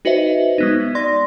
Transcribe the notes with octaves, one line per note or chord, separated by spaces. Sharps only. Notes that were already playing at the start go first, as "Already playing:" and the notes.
D#4 F#4 B4 C5 D#5 E5
G#3 B3 D#4
D5 C6 A#6